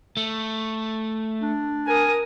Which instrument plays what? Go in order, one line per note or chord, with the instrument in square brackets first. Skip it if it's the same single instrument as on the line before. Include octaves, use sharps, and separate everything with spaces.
[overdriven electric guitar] A3
[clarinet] D4
[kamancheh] A#4 D#6 [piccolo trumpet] G#5